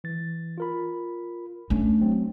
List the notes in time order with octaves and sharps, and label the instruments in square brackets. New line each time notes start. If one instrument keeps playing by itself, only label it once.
[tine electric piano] E3 A6
F4 A#4 B5
[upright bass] A3 D4 [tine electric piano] C#4
[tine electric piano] F#3 C4